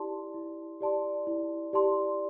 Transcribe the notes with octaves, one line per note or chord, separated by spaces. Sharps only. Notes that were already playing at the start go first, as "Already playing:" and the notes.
Already playing: E4 G4 D5 A5 C6
E4
G4 D5 A5 C6
E4
G4 D5 A5 C6